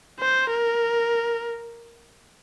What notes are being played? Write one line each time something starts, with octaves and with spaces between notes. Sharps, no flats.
C5
A#4